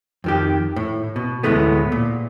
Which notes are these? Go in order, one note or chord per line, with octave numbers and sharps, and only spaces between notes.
F2 D#3 G4
A2
B2
D2 A2 E3 G#3 A3 B3
A#2